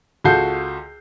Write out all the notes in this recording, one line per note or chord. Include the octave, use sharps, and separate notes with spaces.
C#2 F4 F#4 A4 G6 C7